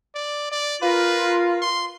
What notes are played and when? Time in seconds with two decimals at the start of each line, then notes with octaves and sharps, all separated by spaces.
0.15 D5
0.52 D5
0.82 F4 A#4 B4
1.62 C6